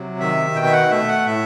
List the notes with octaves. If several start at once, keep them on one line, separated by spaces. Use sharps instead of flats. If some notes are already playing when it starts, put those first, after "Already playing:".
Already playing: C3 F#3
D#3 E5
B2 G5
E5
F#5
A3 E5
F#5
A2 E5